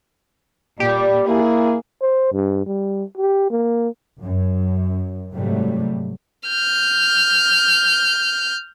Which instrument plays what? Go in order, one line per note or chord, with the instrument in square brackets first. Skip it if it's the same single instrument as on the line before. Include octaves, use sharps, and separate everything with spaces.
[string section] A#2 G3 [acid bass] G4 [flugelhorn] D5
[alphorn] A#3 [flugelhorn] E4 [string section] G#4
[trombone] C5
G2
G3
G4
A#3
[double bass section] F#2
G#2 C3 F#3 G3 A3
[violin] F6 G6